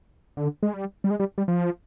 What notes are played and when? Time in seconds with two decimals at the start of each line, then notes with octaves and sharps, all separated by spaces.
0.37 D3
0.63 G#3
0.74 G3
1.04 G3
1.10 G#3
1.20 G3
1.38 G3
1.48 F3